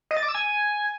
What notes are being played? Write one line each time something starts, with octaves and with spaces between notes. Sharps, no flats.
D#5
A6
D6
E6
G#5